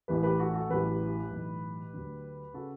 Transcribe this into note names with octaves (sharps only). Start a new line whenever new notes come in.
A1 A2 E3 G4 B4
G4 B4
F#4 A4
F#4 A4
A1 A2 F#3 G4 B4
B1 A2 E3
D2 D3 F#3
C#3 F#4 A4